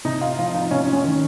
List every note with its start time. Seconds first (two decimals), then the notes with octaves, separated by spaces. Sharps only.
0.05 C3 D#4
0.21 F4
0.38 F3 F4
0.54 D#4
0.71 C3 C#4
0.93 C#4
1.04 D#3